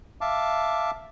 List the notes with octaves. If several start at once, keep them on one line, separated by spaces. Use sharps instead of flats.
E5 F5 A5 D6